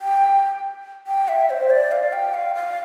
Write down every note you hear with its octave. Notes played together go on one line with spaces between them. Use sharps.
G5
G5
E5
C5
D5
F5
G5
F5
F5